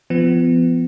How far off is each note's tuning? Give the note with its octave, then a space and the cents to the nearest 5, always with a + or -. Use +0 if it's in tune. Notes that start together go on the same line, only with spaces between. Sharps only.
F3 -25 B3 +30